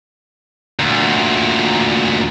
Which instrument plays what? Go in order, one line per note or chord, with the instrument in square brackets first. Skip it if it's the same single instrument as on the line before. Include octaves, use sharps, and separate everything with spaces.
[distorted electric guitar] D2 A#2